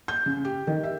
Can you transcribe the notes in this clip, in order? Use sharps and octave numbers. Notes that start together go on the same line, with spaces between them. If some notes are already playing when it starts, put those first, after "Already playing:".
G6
C#3
G4
D#3
E5